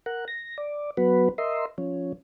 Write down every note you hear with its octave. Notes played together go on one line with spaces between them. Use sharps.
A#4 F#5
A#6
D5
F#3 B3 F#4 B4
A#4 D#5 E5 C6
F3 C#4